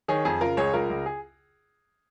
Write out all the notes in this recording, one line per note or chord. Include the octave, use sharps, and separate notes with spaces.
D#3 G#4 C#5
F2 G#4
C#3 F4 A#4
C#2 G#4 C#5
C#2 F4 A#4
C#2
G#4